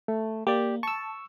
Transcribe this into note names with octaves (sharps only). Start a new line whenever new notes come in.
A3
A#3 G4 D5
A5 C#6 E6